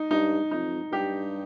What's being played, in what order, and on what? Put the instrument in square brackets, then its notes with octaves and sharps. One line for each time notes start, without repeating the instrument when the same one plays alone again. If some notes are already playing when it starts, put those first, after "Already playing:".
Already playing: [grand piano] D#4
[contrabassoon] G2 [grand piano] D#4
[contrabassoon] F2 [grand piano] D#4
[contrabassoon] G2 [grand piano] G4